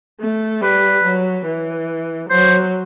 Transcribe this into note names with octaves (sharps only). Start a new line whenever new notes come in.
A3
G3 B4
F#3
E3
F#3 C5